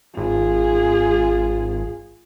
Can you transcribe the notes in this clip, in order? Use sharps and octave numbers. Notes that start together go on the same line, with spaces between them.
G#1 F4 G#4